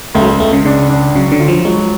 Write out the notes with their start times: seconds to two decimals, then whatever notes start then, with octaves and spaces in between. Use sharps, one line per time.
0.15 C#2 A3
0.22 F#3
0.27 G#3
0.40 C#2 A3
0.53 C#3
0.65 C#3 D4
0.89 D4
1.15 C#3 F#3
1.32 D3
1.40 F4
1.48 F3
1.65 F#3 G#3